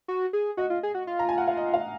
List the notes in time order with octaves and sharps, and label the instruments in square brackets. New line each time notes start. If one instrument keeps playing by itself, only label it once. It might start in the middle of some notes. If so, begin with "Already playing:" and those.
[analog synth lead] F#4
G#4
[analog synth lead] F#4 [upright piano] D#5
[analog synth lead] F4
G#4
F#4
F4
[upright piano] A#5
G#5
F#5
F5
D#5
F5